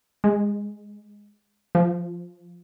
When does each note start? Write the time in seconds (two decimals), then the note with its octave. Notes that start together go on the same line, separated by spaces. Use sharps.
0.24 G#3
1.75 F3